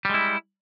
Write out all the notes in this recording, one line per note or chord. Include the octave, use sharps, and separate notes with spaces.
G3 G#3 E4